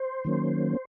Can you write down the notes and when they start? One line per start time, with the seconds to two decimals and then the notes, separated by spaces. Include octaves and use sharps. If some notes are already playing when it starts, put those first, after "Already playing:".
Already playing: C5
0.25 D#3 F#3 A#3 C#4